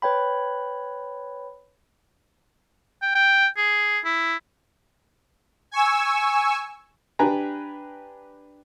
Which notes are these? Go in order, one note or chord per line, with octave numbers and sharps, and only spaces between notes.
B4 C#5 G5 B5
G5
G5
G#4
E4
G#5 C#6 E6
D4 G4 B4 G#5 A#5